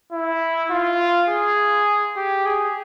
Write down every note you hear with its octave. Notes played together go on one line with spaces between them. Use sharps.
E4
F4
G#4
G4
G#4